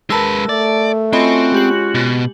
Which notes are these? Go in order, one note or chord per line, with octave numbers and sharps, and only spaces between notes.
G#3 A#4 B4 A5 E6
A3 D5
C4 C#4 F4 F#4 D#5 G#5 B5
G#3 G4 F#7
B2